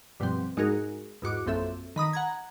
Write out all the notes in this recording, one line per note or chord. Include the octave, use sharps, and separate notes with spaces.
G2 B2 F3 G3 C4
G#2 G#3 D#4 F#4 G#4 A#4
E2 G#2 F#4 D6
A#1 F#2 C4 A4 E5
D#3 B5 D#6 A#6
F#5 A#5 G#6